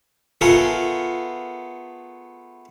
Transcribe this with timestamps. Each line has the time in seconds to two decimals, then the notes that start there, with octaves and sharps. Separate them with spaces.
0.41 A3 B3 F4 G#4 A#4